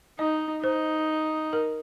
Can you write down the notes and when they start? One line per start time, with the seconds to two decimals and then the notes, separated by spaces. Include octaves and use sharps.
0.19 D#4 D#5
0.64 D#4 C5
1.53 A#4